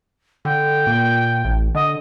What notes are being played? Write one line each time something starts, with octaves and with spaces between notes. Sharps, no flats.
D3 G5
A#2
A1
D3 D#5